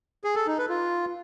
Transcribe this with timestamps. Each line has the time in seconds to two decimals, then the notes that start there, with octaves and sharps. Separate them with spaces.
0.24 G#4
0.36 A4
0.47 D#4
0.58 B4
0.69 F4